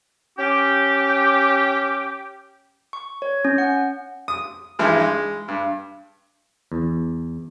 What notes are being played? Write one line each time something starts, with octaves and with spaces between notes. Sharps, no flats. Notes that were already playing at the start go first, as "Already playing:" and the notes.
C#4 G4
C#6
C#5
C#4
F#5
D#6
G2 E3 F3 G#3 D#4
G#3
G2
E2